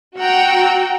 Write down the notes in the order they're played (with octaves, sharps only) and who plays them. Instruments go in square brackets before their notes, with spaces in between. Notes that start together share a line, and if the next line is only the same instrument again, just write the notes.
[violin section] F#4 G5 [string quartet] F#5 A#5 E6